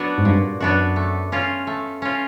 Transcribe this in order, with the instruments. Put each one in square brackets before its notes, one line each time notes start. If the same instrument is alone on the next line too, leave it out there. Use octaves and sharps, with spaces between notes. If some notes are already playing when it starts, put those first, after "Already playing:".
Already playing: [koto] F#3 B3 D4 F#4
[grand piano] G#2
[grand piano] G2 [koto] A#2
[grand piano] F#2 [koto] F#3 B3 D4 F#4
[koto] A3
C#4 F4
A3
C#4 F4